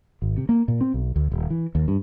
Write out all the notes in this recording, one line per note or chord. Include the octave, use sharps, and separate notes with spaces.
G#1
C3
A#3
A#2
C4
B1
D2
D#1
E3
D#2
G2